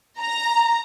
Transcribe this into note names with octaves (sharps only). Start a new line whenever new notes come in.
A#5